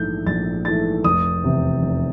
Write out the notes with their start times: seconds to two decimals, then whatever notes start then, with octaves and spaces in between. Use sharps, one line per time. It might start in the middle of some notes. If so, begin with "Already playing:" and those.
Already playing: A#1 G#2 E3 A3 G6
0.26 A#1 A6
0.65 G#2 E3 A3 A6
1.04 F1 D#6
1.44 E2 C3
1.82 F1